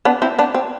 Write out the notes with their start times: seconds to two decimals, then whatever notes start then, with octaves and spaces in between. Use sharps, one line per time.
0.05 B3 D4
0.22 C4 E4
0.39 B3 D4
0.54 C4